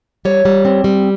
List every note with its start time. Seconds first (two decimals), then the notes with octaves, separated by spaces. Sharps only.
0.25 G3 C#5
0.45 G3
0.65 C4
0.84 G3